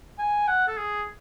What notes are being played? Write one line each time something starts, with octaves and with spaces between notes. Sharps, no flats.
G#5
F#5
A4
G#4